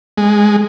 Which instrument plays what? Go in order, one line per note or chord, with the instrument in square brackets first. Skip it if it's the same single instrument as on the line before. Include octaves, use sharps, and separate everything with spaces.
[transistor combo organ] G#3